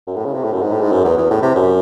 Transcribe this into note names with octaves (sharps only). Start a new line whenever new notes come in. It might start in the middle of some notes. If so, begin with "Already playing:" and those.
F#2
A2
C#3
C3
A2
F#2
G#2
A2
G#2
F#2
E2
E2
A2
C3
F#2